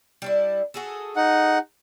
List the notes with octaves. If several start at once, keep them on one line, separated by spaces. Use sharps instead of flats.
G3 D4 E4
F#4 G#4 A4
D#4 F#5